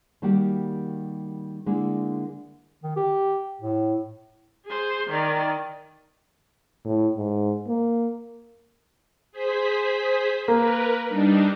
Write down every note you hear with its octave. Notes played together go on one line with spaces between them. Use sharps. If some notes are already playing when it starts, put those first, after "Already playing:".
D#3 G3 A#3 F#4 G4
D3 G#3 A#3 E4
D#3
G4
A2
G#4 C5
D#3 D5
A2
G#2
A#3
G#4 C5 B6
A#3 A#4 B4
G3 D4 D#4